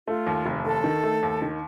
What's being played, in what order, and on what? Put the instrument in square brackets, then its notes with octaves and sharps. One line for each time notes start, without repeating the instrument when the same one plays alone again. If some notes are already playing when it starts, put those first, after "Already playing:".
[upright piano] A3 [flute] F4
[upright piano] D#2
F1
[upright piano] D#2 [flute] A4
[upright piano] D#3
A3
D#2
D#3